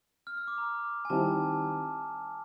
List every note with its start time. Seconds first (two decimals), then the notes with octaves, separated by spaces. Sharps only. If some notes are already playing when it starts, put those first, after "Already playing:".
0.27 F6
0.37 E6
0.48 D6
0.58 A#5
1.05 G#5
1.10 D#3 G3 C4 E4 A5